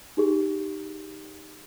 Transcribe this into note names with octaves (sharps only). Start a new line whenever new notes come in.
D#4 G4 G#4